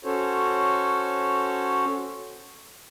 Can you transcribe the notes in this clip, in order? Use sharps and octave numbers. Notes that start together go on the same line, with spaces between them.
C#4 F#4 A4 C5 C#5